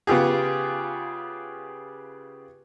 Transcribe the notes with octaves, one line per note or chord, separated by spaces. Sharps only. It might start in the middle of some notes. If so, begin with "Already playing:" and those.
C#3 B3 F4 G4 G#4